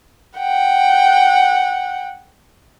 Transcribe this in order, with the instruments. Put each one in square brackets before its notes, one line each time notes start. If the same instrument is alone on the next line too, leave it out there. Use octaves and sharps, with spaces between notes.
[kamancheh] F#5 G5